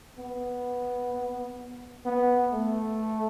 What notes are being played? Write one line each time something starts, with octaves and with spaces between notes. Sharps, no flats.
B3
B3
A3